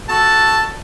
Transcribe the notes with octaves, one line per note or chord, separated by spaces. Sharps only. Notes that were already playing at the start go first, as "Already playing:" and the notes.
F#4 A4 A5